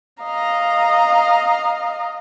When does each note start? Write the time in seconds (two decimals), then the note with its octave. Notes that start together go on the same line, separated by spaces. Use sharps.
0.23 D#5 F5 A#5